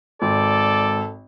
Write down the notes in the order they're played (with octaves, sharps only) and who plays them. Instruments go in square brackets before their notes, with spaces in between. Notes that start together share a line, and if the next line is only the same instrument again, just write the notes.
[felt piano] G#1 [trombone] A4 [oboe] D5